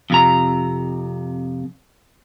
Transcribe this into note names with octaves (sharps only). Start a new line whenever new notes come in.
F2 C3 A#5